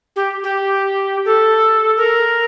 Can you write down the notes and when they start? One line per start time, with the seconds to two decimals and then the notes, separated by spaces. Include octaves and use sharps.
0.15 G4
0.43 G4
1.25 A4
1.96 A#4